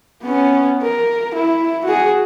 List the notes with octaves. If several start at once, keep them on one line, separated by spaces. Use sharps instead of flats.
B3 C#4
A#4
E4
F#4 G#4